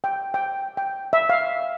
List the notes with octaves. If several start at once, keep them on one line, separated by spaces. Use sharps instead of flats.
G5
G5
G5
E5
F5